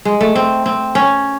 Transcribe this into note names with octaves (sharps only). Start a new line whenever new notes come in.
G#3
A3
C4
C4
C#4